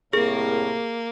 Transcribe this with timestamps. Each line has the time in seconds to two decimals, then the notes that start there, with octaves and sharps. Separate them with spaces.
0.13 C2 A2 A#3 G#4 A#4